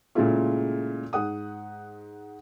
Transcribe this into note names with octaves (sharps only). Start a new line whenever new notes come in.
A#2 C#3 G#3 A3 E4 F4
G#2 F#5 D#6